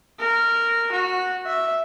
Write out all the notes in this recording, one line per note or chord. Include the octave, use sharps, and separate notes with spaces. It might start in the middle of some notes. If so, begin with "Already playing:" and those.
A#4
F#4
E5